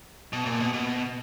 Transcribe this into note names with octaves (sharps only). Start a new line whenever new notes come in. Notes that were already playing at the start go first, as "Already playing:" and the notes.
B2
A#2
B2
B2